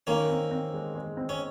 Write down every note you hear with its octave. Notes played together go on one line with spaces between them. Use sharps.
D#3 A#3 C#4
C4
C4
G#3
G#3
C4
C#4